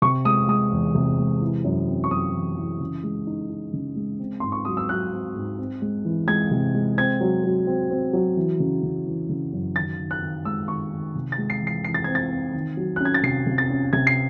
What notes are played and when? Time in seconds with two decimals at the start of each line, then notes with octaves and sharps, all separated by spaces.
0.02 C3 C#6
0.25 G#3 D#6
0.48 G#3 D#6
0.72 E2
0.95 C3
1.18 G#3
1.41 E3
1.65 F#2
1.88 C4
2.04 C#6
2.11 F#2 D#6
2.34 E3
2.57 E3
2.80 C#3
3.04 G#3
3.27 D#4
3.50 D#4
3.73 C#3
3.96 G#3
4.19 C4
4.40 G#2 C6
4.52 C#6
4.65 F#3 D#6
4.77 E6
4.89 F#3 F#6
5.12 C4
5.35 G#2
5.59 C4
5.82 G#3
6.05 E3
6.28 G#3 G#6
6.51 C3
6.74 G#3
6.98 C4 G#6
7.21 F#3
7.44 F#3
7.67 C4
7.91 C4
8.13 F#3
8.37 E3
8.60 C#3
8.83 C#3
9.06 E3
9.29 C#3
9.53 F#2
9.76 D#3 A6
9.99 D#3
10.11 F#6
10.22 D#3
10.45 G#3 E6
10.68 D#3 C#6
10.92 D#3
11.15 C3
11.32 A6
11.38 G#3
11.50 C7
11.61 E3
11.67 C7
11.84 E3 C7
11.94 A6
12.04 C4 G#6
12.15 A6
12.31 C4
12.54 D#3
12.77 F#3
12.96 F#6
13.00 C#4 G#6
13.14 A6
13.23 C3 C7
13.47 C3
13.58 A6
13.70 C#4
13.93 C3 G#6
14.07 C7